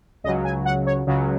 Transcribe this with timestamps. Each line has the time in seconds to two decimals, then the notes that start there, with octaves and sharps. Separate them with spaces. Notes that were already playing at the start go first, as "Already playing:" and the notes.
0.24 C#2 C#3 F#3 D#5
0.45 G#5
0.65 F#5
0.86 C#5
1.07 C#2 C#3 F#3